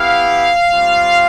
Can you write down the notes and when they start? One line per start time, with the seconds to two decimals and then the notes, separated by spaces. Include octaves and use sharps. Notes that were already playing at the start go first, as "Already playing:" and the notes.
Already playing: B3 E4 G4 F5
0.72 G3 C4 F4